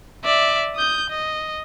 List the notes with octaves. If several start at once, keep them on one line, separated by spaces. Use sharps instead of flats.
D5 E5
D#6 G6
D#5